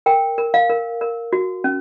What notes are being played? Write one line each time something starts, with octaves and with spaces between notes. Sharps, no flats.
A#4 G5
A#4
F5
A#4
A#4
F#4
C#4